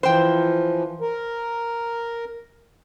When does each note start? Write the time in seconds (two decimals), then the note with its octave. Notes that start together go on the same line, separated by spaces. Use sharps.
0.03 E3 F3 C5 G5
1.01 A#4